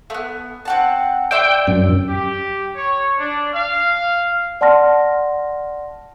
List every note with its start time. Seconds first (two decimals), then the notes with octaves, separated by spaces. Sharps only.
0.10 A3 B3
0.65 C4 F#5 A5
1.31 D5 E5 G5 C6
1.67 F#2
2.08 G4
2.76 C#5
3.18 D4
3.53 F5
4.61 D5 F#5 A5 C6 F6 A#6